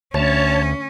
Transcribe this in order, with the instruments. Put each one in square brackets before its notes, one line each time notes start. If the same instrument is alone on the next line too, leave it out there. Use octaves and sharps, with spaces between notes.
[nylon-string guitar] D2 [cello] C#4 [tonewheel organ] C#5 A5